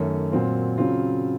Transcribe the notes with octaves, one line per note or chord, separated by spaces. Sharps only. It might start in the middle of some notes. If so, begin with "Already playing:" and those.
Already playing: F#2 D#3 A3 C#4
A#2 F#3 C4 F4
C#3 F#3 C4 F4